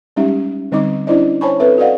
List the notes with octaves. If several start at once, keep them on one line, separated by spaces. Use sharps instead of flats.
G3 G#3 C#4 D#4 G4 E5
D3 G3 C4 D#4 D#5 D6
C#4 D4 E4 C5 D5 D#5
C5 C#5 G#5 A5 B5 C#6
C4 A4 B4 E5
F#4 A4 D5 D#5 F5 F#5